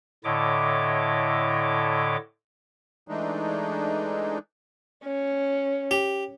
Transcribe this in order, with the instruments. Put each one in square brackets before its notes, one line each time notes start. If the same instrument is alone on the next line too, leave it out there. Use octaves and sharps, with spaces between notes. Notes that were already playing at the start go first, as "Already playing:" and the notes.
[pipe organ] A2 D3 E4 C#5 D#5 D6
[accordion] E3 G#3 A3 D4 D#4
[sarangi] C#4
[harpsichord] G4